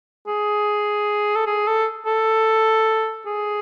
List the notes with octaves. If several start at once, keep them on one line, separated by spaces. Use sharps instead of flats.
G#4
A4
G#4
A4
A4
G#4